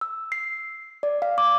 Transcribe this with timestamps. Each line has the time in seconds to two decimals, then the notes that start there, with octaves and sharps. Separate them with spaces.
0.01 E6
0.32 C7
1.03 D5
1.22 F5
1.38 D6